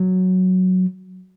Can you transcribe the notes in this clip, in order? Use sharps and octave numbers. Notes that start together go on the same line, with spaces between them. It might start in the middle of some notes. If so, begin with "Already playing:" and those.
Already playing: F#3